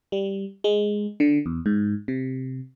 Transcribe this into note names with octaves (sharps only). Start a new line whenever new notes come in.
G3
G#3
D3
E2
G#2
C3